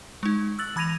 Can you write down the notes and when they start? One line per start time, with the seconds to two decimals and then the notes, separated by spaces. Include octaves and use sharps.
0.23 G#3 D#4
0.59 E6 F#6 A6 F#7
0.76 E3 B5 G#6 A#6 D#7 F7